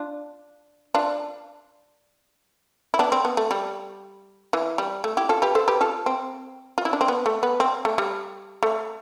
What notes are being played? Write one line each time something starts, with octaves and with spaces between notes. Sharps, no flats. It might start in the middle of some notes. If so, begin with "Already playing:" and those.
Already playing: D4 F4
D4 F4
E4
B3 D4
C4
B3
A3
G3
E3
G3
A3
E4 G4
F4 A4
G4 B4
A4 C5
G4 B4
F4 A4
C4
F4
E4
D4
C4
B3
A3
B3
C4
A3
G3
A3